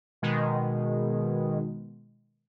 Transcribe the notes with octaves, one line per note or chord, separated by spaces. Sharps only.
B2 D#3 G#3